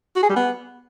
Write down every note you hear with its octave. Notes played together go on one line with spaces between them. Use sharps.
F#4
G#4
G3
B3